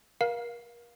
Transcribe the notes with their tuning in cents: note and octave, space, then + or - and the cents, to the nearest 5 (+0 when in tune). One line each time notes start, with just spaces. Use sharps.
A#4 +35 F5 +10